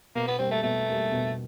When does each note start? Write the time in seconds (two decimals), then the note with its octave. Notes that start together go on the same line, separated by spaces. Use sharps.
0.15 B2 A#3
0.27 B3
0.38 G3 A#3 C4
0.51 A3
0.63 B2 A3
0.88 G3 A#3
1.12 B2